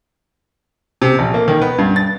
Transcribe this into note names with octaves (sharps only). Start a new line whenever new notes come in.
C3
A#1
A#3
D#3
B3
G2
A6